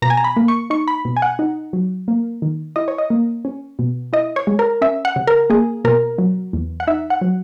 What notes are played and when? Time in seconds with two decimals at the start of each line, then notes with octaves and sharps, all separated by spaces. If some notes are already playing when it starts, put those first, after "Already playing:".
0.02 B2 A#5
0.10 G#5
0.17 A#5
0.24 B5
0.36 A#3
0.48 C#6
0.70 D#4 C#6
0.88 B5
1.05 B2
1.17 G#5
1.22 F#5
1.39 D#4
1.73 F#3
2.08 A#3
2.42 D#3
2.76 E4 D#5
2.88 C#5
2.98 D#5
3.10 A#3
3.45 C#4
3.79 B2
4.13 E4 D#5
4.36 C#5
4.47 G#3
4.59 A#4
4.81 C#4 E5
5.05 F#5
5.16 C#3
5.27 A#4
5.50 A#3 G#4
5.84 B2 A#4
6.18 F#3
6.53 E2
6.80 F#5
6.87 D#4 E5
7.10 F#5
7.21 F#3